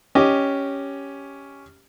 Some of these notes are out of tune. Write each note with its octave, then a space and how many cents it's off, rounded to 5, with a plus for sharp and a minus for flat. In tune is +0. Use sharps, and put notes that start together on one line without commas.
C#4 +5 G4 +0 D#5 +0